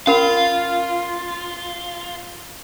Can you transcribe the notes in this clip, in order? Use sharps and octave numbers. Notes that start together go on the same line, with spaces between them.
C#4 F4 A#4 F5 B5